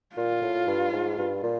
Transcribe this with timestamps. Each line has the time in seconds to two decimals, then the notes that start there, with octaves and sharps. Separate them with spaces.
0.16 A#2 F4
0.42 A2
0.67 G2
0.92 G#2
1.18 G2
1.43 A#2